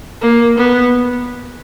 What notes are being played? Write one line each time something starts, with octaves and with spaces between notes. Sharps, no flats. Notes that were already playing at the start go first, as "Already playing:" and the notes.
A#3
B3